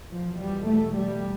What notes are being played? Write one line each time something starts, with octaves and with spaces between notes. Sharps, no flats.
E2 B2 F3
G3
A3
G3